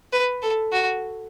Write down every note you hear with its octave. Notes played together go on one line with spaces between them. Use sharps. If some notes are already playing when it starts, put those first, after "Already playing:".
B4
A4
F#4